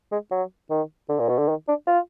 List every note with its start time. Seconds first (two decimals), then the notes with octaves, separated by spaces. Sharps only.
0.12 G#3
0.31 F#3
0.70 D#3
1.09 D3
1.19 A#2
1.29 B2
1.38 D3
1.48 D#3
1.68 D4
1.87 F4